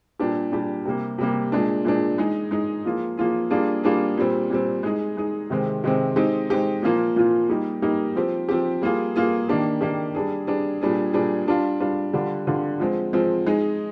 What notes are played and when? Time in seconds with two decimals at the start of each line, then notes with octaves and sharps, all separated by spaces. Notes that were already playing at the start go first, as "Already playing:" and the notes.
0.19 A#2 G3 D4 G4
0.52 A#2 G3 D4 G4
0.85 C3 G3 A#3
1.18 C3 G3 A#3
1.52 A#2 G#3 D4
1.85 A#2 G#3 D4
2.18 G#3 D#4 G#4
2.51 G#3 D#4 G#4
2.85 F3 A#3 F4 G#4
3.18 F3 A#3 F4 G#4
3.50 G3 A#3 D4 F4 G#4
3.84 G3 A#3 D4 F4 G#4
4.18 A#2 G3 C4
4.50 A#2 G3 C4
4.83 G#3 D#4 G#4
5.17 G#3 D#4 G#4
5.50 C3 D#3 G#3 C4
5.84 C3 D#3 G#3 C4
6.16 G#3 C4 D#4 G4
6.50 G#3 C4 D#4 G4
6.82 A#2 F3 A#3 F4
7.16 A#2 F3 A#3 F4
7.49 G3 A#3 D#4 G4
7.82 G3 A#3 D#4 G4
8.16 F3 C4 G4
8.49 F3 C4 G4
8.82 G3 A#3 F4 G#4
9.16 G3 A#3 F4 G#4
9.49 D#3 A#3 D4 G4
9.81 D#3 A#3 D4 G4
10.15 G3 D4 G#4
10.47 G3 D4 G#4
10.81 A#2 G3 D4 G#4
11.14 A#2 G3 D4 G#4
11.47 G3 D4 F4
11.80 G3 D4 F4
12.13 D3 G3 D4 F4
12.47 D3 G3 D4 F4
12.80 F3 G#3 C4
13.13 F3 G#3 C4
13.46 G#3 D#4 G#4